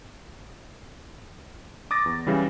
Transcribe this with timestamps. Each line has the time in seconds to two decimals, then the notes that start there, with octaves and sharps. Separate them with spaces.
1.91 D6 D#6 A6 A#6
2.06 E2
2.27 C#3 E3 G3